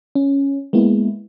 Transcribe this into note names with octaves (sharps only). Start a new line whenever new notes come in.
C#4
G#3 A#3 B3 E4